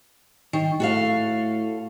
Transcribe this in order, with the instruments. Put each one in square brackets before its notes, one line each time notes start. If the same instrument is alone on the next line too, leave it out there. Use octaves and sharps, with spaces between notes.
[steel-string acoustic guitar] D#3
[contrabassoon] A2 [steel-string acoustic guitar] F#4 A4 F5